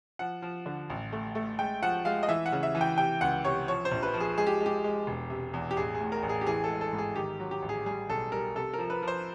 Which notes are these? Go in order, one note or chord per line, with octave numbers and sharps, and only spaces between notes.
F3 F#5
F3
D3
A1
A3
A3
G#3 G5
F3 F#5
G#3 F5
D#5
E3 E5
F#5
C#3
E5
E3
G5
C3 G5
C#2 F#5
C3 C#5
F3 C#5
C5
A#1
B4
F3
G#4
G#3 G#4
G4
G#3
G4
G#3
E1
C3
E2
G4
A1 G#4
G#4
A2
A#4
A1
G#4
G4
E3 G#4
A4
G#3
A4
G#2
G#4
D#3 G4
F#3
G4
A1
G#4
G3 G#4
B1 A4
G3 A#4
C3 A4
F3 A#4
B4
F3
C5